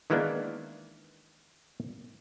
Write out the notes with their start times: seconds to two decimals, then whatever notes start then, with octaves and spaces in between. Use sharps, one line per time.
0.10 D#3 E3 G#3 A#3 B3 D4